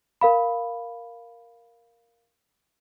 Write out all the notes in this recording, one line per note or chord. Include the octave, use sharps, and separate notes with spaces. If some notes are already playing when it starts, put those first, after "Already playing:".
A#4 F5 B5